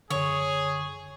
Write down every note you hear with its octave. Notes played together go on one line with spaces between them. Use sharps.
F#2 D3 G#4 C#5